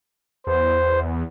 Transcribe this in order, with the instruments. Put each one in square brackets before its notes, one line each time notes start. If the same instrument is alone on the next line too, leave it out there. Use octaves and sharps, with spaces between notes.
[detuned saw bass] E2 [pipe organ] C5